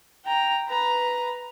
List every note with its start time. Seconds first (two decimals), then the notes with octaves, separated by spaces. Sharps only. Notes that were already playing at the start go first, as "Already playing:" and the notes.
0.24 G5 A#5
0.68 B4 A#5